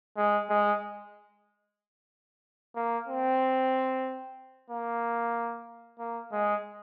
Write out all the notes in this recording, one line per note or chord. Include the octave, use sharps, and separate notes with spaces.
G#3
G#3
A#3
C4
A#3
A#3
G#3